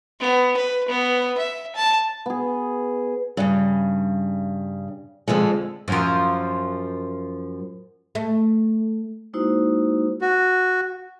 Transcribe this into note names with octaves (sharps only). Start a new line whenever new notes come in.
B3
B4
B3
E5
A5
B3 G#4
G2 C#3
F2 D3 F3 G#3
F#2 F3
A3
G#3 A#3 D#4 E4 F#4 C5
F#4